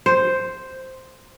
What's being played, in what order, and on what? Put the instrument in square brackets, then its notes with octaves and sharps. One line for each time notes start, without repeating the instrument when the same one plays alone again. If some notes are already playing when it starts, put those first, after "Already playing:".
[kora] C5